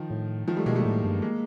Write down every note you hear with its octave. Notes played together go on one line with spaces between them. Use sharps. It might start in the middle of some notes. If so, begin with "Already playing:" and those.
Already playing: D#3 F3
A2
D#3 F3
G3 A3
B2 G#3 A#3
G3 A3
A2
G2
G#3 A#3